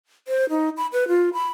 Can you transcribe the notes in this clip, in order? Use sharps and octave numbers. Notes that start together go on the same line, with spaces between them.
C5
D#4
B5
B4
F4
B5